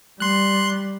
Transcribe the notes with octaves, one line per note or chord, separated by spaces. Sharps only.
G3 C6 F#6